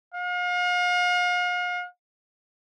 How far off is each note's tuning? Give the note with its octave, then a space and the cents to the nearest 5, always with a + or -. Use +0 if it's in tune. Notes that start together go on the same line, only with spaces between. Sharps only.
F5 +40